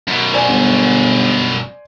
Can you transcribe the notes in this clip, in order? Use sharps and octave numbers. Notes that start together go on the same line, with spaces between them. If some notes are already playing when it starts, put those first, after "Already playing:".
F#2 B2
C5 D5 G#5
G1